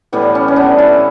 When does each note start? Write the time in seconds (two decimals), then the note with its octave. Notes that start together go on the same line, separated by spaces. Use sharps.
0.13 A2 E3 G3 B3
0.35 C#4
0.48 C#4
0.56 B3 D4
0.78 C#4 E4